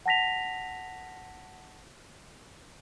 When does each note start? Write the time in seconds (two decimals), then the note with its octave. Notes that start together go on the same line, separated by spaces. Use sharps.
0.06 F#5 A5 A#6 B6 F7